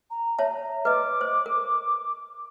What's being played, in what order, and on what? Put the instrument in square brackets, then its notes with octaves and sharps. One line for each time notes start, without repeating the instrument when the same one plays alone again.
[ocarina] A#5
[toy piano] C#5 E5 A5
[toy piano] B4 D#5 [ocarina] D6
[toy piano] C5
A#4